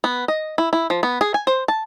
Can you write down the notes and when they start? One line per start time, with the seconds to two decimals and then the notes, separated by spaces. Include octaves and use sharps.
0.04 B3
0.28 D#5
0.58 E4
0.73 E4
0.90 F3
1.03 B3
1.21 G#4
1.34 G#5
1.47 C5
1.68 A5